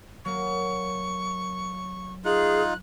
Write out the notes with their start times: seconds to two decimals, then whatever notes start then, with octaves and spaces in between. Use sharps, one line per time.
0.25 F#3 A#3 C#6
2.25 D#4 F4 G#4 F#6